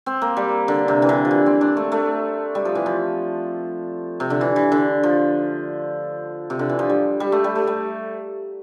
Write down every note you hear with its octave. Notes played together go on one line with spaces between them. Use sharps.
C4
A#3
G3
D3
C3
E3
D3
F3
E3
C4
D4
A3
A3
G3
F3
E3
F3
C3
D3
E3
E3
D3
F3
C3
D3
E3
F3
G3
G3
A3
G3
A3
G3